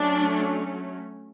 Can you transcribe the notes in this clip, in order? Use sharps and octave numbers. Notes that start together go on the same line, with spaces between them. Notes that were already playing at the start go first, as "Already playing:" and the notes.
Already playing: F#3 A3 C#4 D4